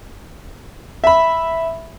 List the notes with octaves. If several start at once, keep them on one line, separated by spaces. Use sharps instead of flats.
E5 B5